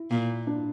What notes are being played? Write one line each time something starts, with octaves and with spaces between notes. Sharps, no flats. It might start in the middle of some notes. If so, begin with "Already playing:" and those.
Already playing: E4
A#2
D4